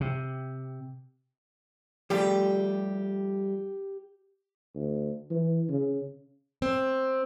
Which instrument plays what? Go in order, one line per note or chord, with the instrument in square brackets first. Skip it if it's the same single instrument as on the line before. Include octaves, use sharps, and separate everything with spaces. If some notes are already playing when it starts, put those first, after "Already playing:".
[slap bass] C3
[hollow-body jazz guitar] F3 G3 A3 [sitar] G4
[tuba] D2
E3
C#3
[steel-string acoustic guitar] C4